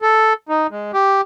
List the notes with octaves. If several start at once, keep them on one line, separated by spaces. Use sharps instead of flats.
A4
D#4
G#3
G4